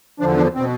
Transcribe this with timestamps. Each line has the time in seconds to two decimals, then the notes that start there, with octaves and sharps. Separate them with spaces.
0.20 E2 D3 F3 D4
0.37 D4
0.55 B2 C4